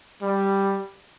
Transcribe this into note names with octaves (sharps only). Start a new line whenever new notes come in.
G3